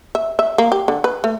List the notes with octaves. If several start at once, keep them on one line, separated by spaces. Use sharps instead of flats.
E5
E5
A#3
G4
D3
B4
A3